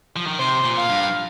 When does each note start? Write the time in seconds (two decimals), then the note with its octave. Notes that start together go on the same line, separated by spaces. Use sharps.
0.16 F3
0.27 D#3
0.39 C3 C5
0.65 A#2
0.77 F5
0.89 G2